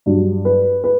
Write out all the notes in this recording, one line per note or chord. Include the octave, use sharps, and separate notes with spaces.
G2 F#3
B4
B4